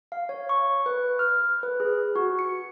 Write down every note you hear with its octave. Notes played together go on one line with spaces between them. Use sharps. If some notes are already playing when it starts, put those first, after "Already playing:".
F5
C#5
C#6
B4
F6
B4
G#4
F#4
C#7